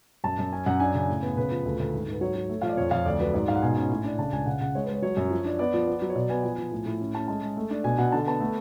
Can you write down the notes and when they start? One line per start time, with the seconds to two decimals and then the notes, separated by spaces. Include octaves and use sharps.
0.24 F#2 A5
0.38 F#2
0.52 C#4 G#5
0.66 F#2 F#5
0.80 D4 G#5
0.95 C#3
1.08 A2
1.22 B3
1.37 C#3 B4
1.51 F3
1.65 D2
1.79 D2
1.93 G#2
2.08 G#2 B4
2.21 F#3 C#5
2.35 F#3
2.49 A3
2.62 F3 F5
2.69 D5
2.77 F2 C#5
2.91 F2 F5
3.06 D2 D5
3.19 F#3 B4
3.34 G#2 D5
3.48 G#2 F5
3.55 F#5
3.62 B2 G#5
3.76 C#4
3.90 A2
4.04 D4
4.18 C#3 A5
4.32 C#2 G#5
4.46 C#3 F#5
4.61 C#3 F#5
4.75 G#3 C#5
4.84 B4
4.89 G#3 C#5
5.02 F#3 C#5
5.17 F#2
5.30 F3
5.45 D4
5.59 B3 D5
5.74 F3
5.87 B3
6.02 F#3
6.09 C#5
6.15 B2 D5
6.30 B3 G#5
6.43 F3 G#5
6.58 F3
6.72 A2
6.86 A2
7.00 C#4
7.14 C#4 A5
7.28 G#3 A5
7.42 G#3
7.57 A3
7.70 D4
7.84 B2 G#5
7.98 B2 F#5
8.12 D3 A5
8.27 B3 A5
8.40 A3